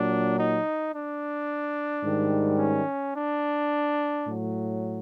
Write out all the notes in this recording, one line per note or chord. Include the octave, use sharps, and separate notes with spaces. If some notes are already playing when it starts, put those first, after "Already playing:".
Already playing: A#2 F#3 D4
D#4
D4
G#2 D#3 G3
C#4
D4
A2 F#3